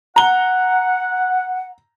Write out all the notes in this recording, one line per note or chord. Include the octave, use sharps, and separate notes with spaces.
F#5 A#5 G7